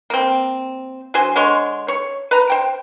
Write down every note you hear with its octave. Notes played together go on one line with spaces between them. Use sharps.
A#3 C4
F#3 D4 G#4 C5
D3 G#3 C#5 C6
C#5
B4 A#5
C5 G5